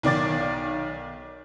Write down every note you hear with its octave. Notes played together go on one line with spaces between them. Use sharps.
B1 D#3 D5 D6 A6